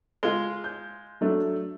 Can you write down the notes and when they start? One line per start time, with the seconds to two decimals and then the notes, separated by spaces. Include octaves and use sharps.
0.23 G#3 F4 G7
0.64 G6
1.21 F#3 A3 D4